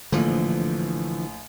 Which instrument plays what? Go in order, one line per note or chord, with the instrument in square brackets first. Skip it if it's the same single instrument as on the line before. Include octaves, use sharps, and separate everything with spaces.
[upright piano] A#1 A2 [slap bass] D3 E3 F3